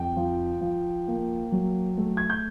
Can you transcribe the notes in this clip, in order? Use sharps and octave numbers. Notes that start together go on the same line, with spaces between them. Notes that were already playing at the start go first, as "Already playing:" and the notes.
Already playing: F2 G5
F3
F3
A#3
F#3
A3
G#6
G6